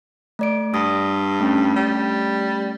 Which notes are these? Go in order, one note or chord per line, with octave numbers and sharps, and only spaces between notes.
A3 D5 D7
G2 D#6 A#6
A3 C#4
G3